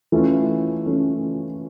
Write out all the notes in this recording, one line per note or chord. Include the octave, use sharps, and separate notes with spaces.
E3 A3 C#4 F4
E3 A3 C#4 F4